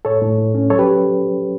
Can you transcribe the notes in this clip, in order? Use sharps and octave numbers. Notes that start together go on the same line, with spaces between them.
A2 A4 C#5
A2
A2
C#4
F#3 A4 C#5
G4 B4